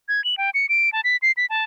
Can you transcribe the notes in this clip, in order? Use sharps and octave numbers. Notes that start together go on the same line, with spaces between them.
G#6
F#7
G5
C#7
D7
A5
B6
C7
B6
A5